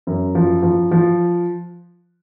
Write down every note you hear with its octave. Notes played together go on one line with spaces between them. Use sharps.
F#2
F3
F3
F3